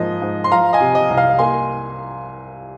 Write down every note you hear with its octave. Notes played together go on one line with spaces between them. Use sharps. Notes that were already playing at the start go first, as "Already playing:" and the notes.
Already playing: G#2 F3 A#3 D#5
G#2
C6
F3 F5 A#5
D#5 G#5
C3
D#5
C2
F5
A#3 G#5 C6